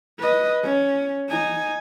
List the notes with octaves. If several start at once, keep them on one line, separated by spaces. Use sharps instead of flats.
B4 D#5
C#4
D#4 G#5